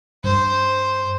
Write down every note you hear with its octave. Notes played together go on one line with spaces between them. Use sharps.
G2 C5